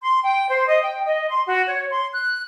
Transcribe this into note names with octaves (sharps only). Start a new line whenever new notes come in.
C6
G5
C5
D#5
G5
D#5
C6
F#4
C#5
C6
F#6